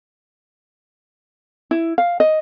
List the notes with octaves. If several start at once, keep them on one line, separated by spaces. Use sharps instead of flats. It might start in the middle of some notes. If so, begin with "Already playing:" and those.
E4
F5
D#5